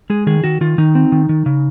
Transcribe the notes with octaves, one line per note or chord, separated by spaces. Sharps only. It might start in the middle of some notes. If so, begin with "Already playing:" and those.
G#3 G#4
D#3 G#4
D#3 F#4
D#3 F4
D#3 D#4
C4
D#3
D#3
C#3